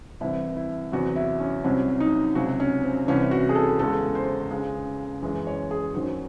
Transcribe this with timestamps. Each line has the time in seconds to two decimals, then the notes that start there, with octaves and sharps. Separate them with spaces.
0.21 C2 C3 E3 E4
0.57 E4
0.92 E2 C3 F#3 F#4
1.16 E4
1.40 C#4
1.64 C2 C3 F#3 C#4
2.00 D#4
2.35 C#2 C3 F#3 F#4
2.60 C#4
2.83 C4
3.07 C2 C3 E3 C#4
3.31 F#4
3.49 G#4
3.55 A4
3.79 E2 C#3 G#3 A4
4.15 C5
4.51 C#2 C#3 G#3
5.22 F#2 E3 G#3
5.47 C#5
5.71 G#4
5.94 F#2 D#3 F#3 C5